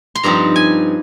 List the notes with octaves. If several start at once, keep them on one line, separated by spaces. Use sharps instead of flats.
C6
G2 F3 C4 D#4 A#5
G#5